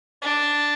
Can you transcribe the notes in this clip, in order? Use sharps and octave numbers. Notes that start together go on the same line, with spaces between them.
D4